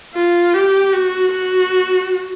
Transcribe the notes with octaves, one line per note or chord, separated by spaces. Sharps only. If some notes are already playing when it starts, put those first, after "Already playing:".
F4
G4
F#4
F#4